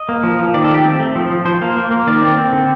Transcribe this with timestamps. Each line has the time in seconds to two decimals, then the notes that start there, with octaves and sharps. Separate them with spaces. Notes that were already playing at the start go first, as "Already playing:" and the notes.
Already playing: D#5
0.09 A#3
0.23 F3
0.39 F3
0.54 D#3 D5
0.64 A4
0.70 A3 G4
0.84 C4
1.00 A3
1.15 F3
1.30 F3
1.45 F3 C5
1.62 A#3
1.77 A#3
1.91 A#3
2.07 D#3 D5
2.21 C4
2.37 C4
2.53 D3